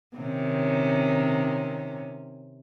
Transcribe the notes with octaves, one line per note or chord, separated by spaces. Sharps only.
C3 D#3 C#4